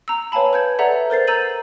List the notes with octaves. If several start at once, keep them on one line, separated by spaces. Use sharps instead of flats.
A#5 E6
B4 C#5 F5 G#5 A5 B5
B4 G6 G#6
A4 B4 D5 E5 F#5 A#5
A#4 C5 A6 C7
A#5 E6 G6 A6 D#7 F#7